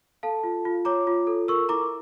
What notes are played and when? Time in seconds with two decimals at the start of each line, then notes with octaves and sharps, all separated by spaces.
0.23 A4 F5 A5
0.44 F4
0.65 F4
0.85 C#5 A#5 D6
1.07 F4
1.27 A4
1.48 A#4 C#6 E6
1.69 E4 A#5 D6